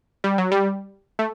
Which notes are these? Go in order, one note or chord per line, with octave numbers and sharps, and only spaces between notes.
G3
F#3
G3
A3